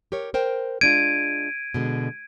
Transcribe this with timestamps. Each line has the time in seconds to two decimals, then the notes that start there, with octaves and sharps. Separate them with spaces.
0.12 G4 A#4 C#5
0.34 A#4 C5 G5
0.81 G#3 D4 F4 G#6 D7 D#7
1.74 B2 D3 G#3